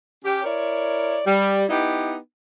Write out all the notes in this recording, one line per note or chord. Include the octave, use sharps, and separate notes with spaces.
C#4 G4
E4 A#4 C#5 D5
G3
B3 D#4 E4 G4